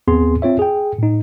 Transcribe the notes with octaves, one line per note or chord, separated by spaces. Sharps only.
D#2 B3 C4 G#4 C6
C4 F4 C#5 E5
G#4 G5
A2 D#4